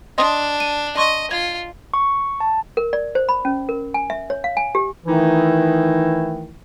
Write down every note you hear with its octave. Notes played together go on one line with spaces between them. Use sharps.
D4 D#5 C6 D#6
D#7
D#5 C6 C#6
F4 G#6
C#6
A5
A#4
D5
C5
B5
C#4
A#4
G#5
E5
C#5
F5
G#5
G4
D#3 E3 A3 D#4 E4